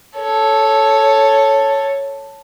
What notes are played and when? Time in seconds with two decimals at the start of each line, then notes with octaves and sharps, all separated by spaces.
0.18 A4 C#5